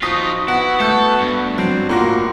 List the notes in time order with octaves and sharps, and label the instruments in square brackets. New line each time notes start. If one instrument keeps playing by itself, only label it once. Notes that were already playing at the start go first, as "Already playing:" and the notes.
[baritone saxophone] F3 [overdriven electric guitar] D#4 F4 [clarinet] F#4 [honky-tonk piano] D#6 A#6 B6
[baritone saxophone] B3 [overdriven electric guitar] E4 [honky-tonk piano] F#5
[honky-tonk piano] A3 G6 [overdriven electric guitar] A4
[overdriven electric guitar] G2
[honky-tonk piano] F#3 [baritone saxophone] C4
[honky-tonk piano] A2 F#4 A#6 [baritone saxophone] A#3 [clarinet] F4